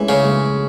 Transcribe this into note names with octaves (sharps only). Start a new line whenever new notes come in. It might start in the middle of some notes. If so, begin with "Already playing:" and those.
Already playing: E3 G#3 A3 C#4
C#3
G#3